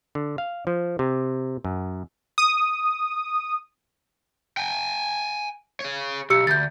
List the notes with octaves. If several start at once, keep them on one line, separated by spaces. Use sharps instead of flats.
D3
F5
F3
C3
F#2
D#6
G5 G#5
G#4 C#5
B1 G4 E6 C#7
D2 G6 A6